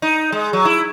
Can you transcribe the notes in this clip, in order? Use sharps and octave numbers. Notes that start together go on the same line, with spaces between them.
D#4
G#3
F#3
E4